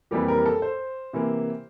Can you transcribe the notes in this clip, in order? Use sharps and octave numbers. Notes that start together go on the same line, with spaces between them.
F2 E3 G3 A#3 G4
A#4
A4
C5
C3 E3 A#3